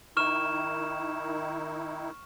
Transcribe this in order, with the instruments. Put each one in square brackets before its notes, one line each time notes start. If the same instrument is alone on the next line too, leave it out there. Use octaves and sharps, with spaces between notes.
[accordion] D#3 D#4 E4 [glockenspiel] C#6 F6 E7